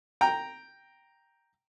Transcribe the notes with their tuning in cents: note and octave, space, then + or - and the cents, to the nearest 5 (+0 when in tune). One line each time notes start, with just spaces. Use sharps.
G5 +0 A#5 +0